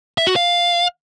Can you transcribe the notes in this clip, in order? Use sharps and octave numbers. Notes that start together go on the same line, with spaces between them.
E5
F#4
F5